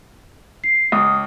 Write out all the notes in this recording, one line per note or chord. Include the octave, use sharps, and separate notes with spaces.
C7
C#2 D#6